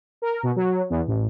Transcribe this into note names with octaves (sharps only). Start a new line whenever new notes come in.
A#4
B2
F#3
E2
A1